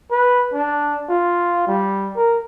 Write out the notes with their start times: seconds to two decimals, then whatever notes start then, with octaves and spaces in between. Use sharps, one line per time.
0.11 B4
0.53 D4
1.09 F4
1.67 G3
2.16 A#4